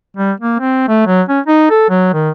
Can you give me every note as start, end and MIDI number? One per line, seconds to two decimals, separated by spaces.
0.17 0.32 55
0.40 0.58 58
0.60 0.86 60
0.88 1.05 57
1.07 1.22 54
1.29 1.40 61
1.46 1.68 63
1.70 1.87 69
1.90 2.09 54
2.14 2.30 51